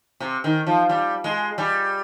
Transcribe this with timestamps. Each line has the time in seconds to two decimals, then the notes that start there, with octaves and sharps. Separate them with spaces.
0.20 C3
0.44 D#3
0.67 F3
0.89 G3
1.24 G#3
1.58 G3